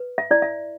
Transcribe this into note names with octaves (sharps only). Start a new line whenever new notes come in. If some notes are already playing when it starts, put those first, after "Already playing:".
Already playing: B4
E5
E4 D5
E5